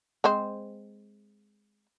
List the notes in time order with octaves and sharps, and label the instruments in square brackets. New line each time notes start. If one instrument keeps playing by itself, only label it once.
[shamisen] G#3 C4 C5